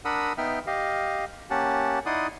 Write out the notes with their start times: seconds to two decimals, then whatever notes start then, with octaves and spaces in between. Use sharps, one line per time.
0.05 D4 A#4 F#5 B5 D#6 E6
0.38 B3 D#4 E5 G5 F6
0.67 G4 D#5 F5
1.50 A#3 C#4 G4 F#5 A5
2.06 D#4 E4 D5 F#5 C6 D#6